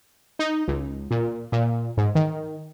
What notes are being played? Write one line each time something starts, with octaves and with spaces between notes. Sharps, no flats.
D#4
C#2
A#2
A#2
G#2
D#3